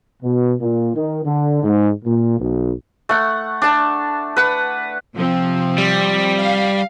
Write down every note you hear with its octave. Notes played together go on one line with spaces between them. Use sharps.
B2
A#2
D#3
D3
G#2
A#2
B1
A3 F#5
D4 A5
B4 F#5
C3 F3 C4
G3
F5